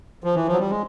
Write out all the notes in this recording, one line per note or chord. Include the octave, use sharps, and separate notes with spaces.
F3
E3
F3
F#3
G3
G#3